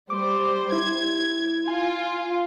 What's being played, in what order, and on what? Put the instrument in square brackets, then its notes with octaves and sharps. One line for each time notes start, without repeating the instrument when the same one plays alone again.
[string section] G3 C5 [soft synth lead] D6
[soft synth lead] E4 [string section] G#6
[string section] F4 [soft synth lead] G#5